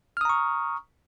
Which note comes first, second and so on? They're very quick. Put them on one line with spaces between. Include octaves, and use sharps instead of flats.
F6 D#6 A#5 C#6